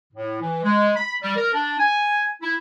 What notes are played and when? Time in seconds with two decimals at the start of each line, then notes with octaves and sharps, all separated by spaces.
0.13 A2
0.40 E3
0.63 G#3
0.96 B5
1.22 G3
1.36 A#4
1.53 D4
1.79 G#5
2.42 E4